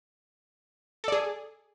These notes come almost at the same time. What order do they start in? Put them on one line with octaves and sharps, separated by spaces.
A4 D5 G#4